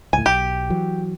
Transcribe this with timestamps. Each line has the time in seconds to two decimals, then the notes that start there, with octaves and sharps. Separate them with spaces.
0.13 C#2 A2 G#5
0.26 B1 G4
0.70 E3 F#3